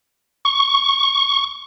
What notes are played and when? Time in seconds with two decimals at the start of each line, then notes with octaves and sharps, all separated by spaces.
0.45 C#6